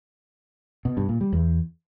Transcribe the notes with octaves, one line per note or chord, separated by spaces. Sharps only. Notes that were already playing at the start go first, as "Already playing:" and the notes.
B2
G2
A#2
G3
E2